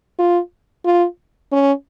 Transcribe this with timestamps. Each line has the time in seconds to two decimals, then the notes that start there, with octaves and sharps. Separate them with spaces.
0.19 F4
0.85 F4
1.52 C#4